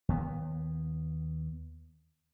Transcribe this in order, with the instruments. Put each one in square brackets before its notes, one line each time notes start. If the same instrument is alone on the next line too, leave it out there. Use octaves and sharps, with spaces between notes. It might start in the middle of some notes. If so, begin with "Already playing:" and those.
[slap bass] D#2 B3